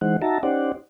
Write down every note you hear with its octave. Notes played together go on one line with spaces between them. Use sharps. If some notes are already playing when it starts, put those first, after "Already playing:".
E3 G#3 D#4 C5 F#5
D#4 F#4 E5 A5 A#5
C#4 D#4 G4 C5 D5 F#5